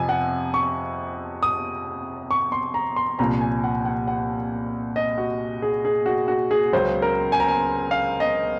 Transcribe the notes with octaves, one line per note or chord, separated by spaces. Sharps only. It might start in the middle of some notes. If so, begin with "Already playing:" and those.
Already playing: F2 C3 F3 G#5
F#5
C#6
D#6
C#6
C6
A#5
C6
C2 A#2 F3 A#5
G#5
F#5
F#5
F#5
D#5
F#4
G#4
G#4
F#4
F#4
G#4
C#2 C#3 F#3 C5
A#4
G#5
A#5
G#5
F5
D#5